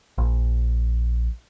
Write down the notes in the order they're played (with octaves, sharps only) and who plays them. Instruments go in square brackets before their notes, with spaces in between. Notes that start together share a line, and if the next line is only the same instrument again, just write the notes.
[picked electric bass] A#1